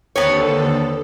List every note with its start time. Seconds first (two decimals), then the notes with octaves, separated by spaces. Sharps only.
0.16 D#2 D3 B3 C4 A4 C#5